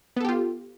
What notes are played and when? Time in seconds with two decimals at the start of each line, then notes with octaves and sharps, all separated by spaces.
0.17 B3
0.21 A4
0.25 G4
0.29 F4